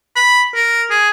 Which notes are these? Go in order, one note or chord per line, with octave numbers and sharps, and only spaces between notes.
B5
A#4
G#4